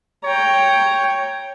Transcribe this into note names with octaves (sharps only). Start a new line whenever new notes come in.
C#5 G5 A#5